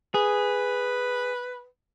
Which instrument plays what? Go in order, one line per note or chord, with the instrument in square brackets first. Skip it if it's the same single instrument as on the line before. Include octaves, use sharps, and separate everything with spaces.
[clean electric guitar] G#4 [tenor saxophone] B4